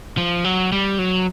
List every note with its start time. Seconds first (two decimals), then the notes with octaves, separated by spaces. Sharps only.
0.18 F3
0.45 F#3
0.72 G3
0.99 F#3